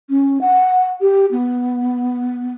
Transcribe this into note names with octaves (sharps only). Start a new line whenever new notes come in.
C#4
F#5
G4
B3